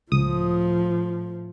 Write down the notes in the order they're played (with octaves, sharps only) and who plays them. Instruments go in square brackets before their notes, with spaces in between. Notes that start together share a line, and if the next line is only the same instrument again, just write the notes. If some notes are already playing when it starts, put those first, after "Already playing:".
[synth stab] C#2 D#6 [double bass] A2 F3